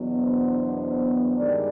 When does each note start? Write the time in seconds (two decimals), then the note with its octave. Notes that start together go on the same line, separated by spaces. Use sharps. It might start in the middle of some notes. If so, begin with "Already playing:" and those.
Already playing: E2 B2 F#3 B3 D4
0.19 C5
1.36 G2 D#3 G#3 D5